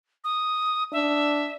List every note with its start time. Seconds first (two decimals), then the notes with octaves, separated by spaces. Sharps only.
0.24 D#6
0.92 D4 E5